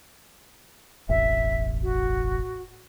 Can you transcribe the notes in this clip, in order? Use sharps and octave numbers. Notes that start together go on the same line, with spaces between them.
E1 A1 E5
F#4